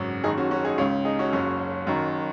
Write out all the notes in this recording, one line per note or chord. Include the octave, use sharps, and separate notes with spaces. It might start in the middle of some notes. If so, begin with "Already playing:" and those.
Already playing: G#1 F#2 C#3 F#4
F#1 F#2 D#3 D#4 G#4
C#4 F#4
C#4 F#4
D#4 G#4
C#2 C#3 G#4 C#5
D#4 G#4
C#4 F#4
F#1 F#2 C#3 C#4 F#4
F#1 F#2 D#3